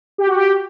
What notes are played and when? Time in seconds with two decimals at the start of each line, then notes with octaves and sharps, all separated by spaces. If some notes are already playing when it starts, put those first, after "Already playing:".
0.18 G4
0.27 F#4
0.36 G4